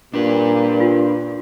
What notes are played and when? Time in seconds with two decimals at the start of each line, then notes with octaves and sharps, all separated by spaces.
0.14 A#2 D4 G4 B4
0.80 F4